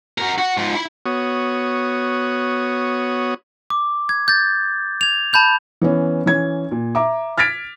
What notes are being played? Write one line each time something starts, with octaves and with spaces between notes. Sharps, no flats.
F#4 A#4
F#4
G#2 F3
E4 B5
B3 F#4 C#5 D#6
D6
G#6
G6 A6
G#6 F7
A5 B5 G6 F7
E3 B3 C#4
E3 C#4 G#6
A#2
E5 A#5 D6
F6 G#6 A6 B6 D7